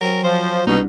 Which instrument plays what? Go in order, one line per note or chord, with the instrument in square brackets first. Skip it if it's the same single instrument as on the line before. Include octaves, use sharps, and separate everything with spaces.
[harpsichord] F#3 C4 C#4 [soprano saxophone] A#4
[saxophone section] F3 [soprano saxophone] C5
[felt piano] C2 D4 [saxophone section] B2 [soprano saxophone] D#4